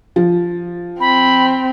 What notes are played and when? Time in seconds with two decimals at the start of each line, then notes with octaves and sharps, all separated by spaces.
0.16 F3
1.00 C4 B5